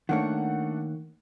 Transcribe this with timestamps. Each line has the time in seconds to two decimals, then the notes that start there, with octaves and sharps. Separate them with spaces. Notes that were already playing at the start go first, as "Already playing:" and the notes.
0.09 D#3 A3 A#3 D4 C#5 F#5